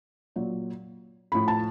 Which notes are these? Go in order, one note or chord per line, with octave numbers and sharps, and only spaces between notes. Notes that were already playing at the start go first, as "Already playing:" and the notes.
A#2 F#3
A2 F3 B5
A5